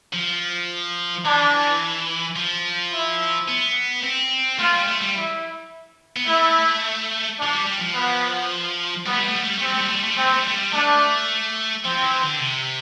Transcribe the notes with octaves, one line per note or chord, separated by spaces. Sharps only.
F3
E3 D4
F3
E4
B3
C4
A3 F4
G3
A3
G3
E4
B3
A3 E4
F3 D4
G3
G3
F3
B3
G3 B3
A3
G3
A3
G3
A3
G3
A3
G3 C4
A3
G3
A3
G3
A3
G3
A3 C4
G3
A3
G3
A3
G3
A3 D4
F3 C4
E3
D3
C3